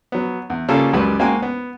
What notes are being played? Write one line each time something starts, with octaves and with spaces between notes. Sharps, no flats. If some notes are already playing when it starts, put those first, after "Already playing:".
F#3 B3
E2
C#3 G3 A#3 F4 G#4 A4
C#2 F#2 G3 B4
G#3 A#3 F#4 G5 G#5
B3